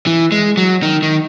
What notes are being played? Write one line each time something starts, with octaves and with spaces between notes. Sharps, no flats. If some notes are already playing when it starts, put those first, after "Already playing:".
E3
G#3
F#3
D#3
D#3